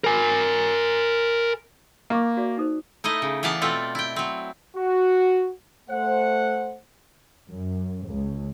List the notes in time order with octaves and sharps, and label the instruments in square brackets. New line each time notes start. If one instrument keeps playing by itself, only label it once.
[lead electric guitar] A#4 G#5
[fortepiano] A#3 [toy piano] D#5 C#6 D6
[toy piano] F#4 D5 E5
D#4 A4 C5
[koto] A3 D#4 E4 D#5
C#3
E3 B3 D5 F5 A5
B2 A3 C4 F4 A4
E4 G5
F#3 C4
[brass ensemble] F#4
A3 C5 F#5
[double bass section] F#2
C#2